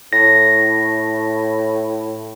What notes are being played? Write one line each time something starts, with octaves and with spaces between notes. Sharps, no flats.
A2 A#6